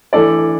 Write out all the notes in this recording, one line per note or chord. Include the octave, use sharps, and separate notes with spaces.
E3 A3 D4 A4 D5